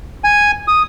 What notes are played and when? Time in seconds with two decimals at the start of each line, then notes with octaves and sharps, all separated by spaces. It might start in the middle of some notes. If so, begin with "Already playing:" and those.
0.24 G#5
0.68 D#6